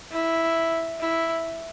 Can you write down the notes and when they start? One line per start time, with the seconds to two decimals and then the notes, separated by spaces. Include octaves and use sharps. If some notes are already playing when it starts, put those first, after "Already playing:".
0.12 E4
1.00 E4